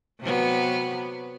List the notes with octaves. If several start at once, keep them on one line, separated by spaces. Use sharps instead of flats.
C3 F#3 B3